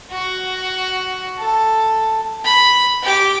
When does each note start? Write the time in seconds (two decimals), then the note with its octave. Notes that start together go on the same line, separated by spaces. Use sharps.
0.11 F#4
1.38 A4
2.44 B5
3.02 G4 D6